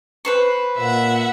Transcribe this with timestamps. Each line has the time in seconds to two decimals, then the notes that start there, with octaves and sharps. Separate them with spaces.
0.25 B4 C5 C#6
0.78 A#2 E5 F#5